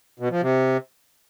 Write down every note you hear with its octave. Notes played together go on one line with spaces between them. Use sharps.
B2
F3
C3